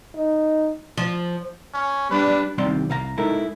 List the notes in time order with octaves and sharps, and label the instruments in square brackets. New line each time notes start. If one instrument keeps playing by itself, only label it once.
[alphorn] D#4
[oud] F3
[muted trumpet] C#4
[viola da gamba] G3 D4 [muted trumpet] B4
[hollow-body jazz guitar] C2 D#3 G3 C4 D5 C6
C2 F5 A#5
G#3 D#4 E4 A4 A#4